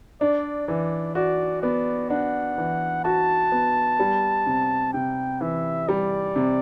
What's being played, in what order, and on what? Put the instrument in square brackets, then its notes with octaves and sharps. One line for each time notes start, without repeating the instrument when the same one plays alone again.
[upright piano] D4 [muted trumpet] D5
[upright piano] E3 [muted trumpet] D5
[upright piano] F#4 [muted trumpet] D5
[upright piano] B3 [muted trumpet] D5
[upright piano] D4 [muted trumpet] F#5
[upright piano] E3
[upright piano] F#4 [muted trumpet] A5
[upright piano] B3
G3
C3
[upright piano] C3 [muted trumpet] G5
[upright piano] E3 [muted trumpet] E5
[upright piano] G3 [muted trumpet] D5
[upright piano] C3